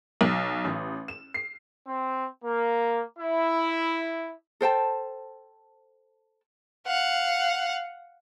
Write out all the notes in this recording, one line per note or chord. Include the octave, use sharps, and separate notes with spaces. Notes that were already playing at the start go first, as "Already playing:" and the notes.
B1
A1
E7
C7
C4
A#3
E4
A4 C5 G5 A5
F5 F#5